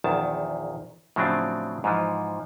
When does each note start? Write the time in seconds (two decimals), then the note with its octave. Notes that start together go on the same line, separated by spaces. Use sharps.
0.04 A#1 E2 D#3 A5
1.16 A2 C#3 F3 F#3 C4 D4
1.84 G#2 E3 F3